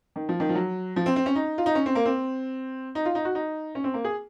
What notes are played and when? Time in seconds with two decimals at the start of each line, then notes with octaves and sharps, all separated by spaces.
0.16 D#3
0.29 F3
0.40 D#3
0.49 F3
0.55 F#3
0.96 F3
1.06 C4
1.16 C4
1.26 C#4
1.35 D#4
1.58 F4
1.66 D#4
1.75 C#4
1.86 C4
1.95 A#3
2.05 C4
2.95 D#4
3.05 F4
3.15 D#4
3.25 F#4
3.35 D#4
3.75 C#4
3.84 C4
3.94 A#3
4.04 G#4